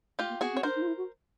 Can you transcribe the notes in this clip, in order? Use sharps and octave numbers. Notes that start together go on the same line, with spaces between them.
A3 F4 G4
A#3
B3 F#4 G#4
C4
C#5
D4 A#4 C5
D#4
F4
E4
F#4